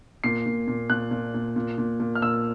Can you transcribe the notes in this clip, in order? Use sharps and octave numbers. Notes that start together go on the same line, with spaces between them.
A#2 C7
A#2
A#2
A#2 F#6
A#2
A#2
A#2
A#2
A#2
F6
A#2 E6